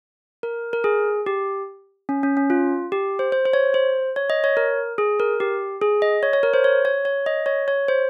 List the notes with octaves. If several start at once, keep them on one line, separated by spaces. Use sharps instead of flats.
A#4
A#4
G#4
G4
C#4
C#4
C#4
F4
G4
C5
C5
C5
C#5
C5
C#5
D#5
C#5
A#4
G#4
A#4
G4
G#4
D#5
C#5
C#5
A#4
C5
C#5
C#5
C#5
D#5
C#5
C#5
C5